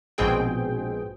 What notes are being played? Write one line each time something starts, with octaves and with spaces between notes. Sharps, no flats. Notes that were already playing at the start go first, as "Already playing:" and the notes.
A#1 G#2 B2 C4 G#4 G5